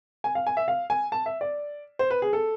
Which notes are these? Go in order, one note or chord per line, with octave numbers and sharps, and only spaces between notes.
G#5
F5
G#5
E5
F5
G#5
A5
E5
D5
C5
B4
G#4
A4